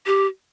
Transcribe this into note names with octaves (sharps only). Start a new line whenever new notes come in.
G4